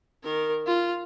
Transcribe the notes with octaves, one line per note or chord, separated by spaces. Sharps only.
D#3 A#4
F4